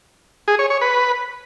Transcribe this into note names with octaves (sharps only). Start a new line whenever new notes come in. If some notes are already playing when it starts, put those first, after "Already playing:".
G#4
C#5
C#5
B4